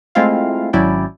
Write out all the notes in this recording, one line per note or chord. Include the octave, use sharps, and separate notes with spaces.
G#3 A3 C4 E4 F4 F5
G#1 F#3 C#4 E4 D5 G5